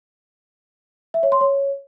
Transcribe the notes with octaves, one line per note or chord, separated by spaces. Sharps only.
E5
C#5
C6
C#5